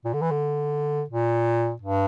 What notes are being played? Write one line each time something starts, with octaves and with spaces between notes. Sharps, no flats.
A#2
D3
E3
D3
A#2
G2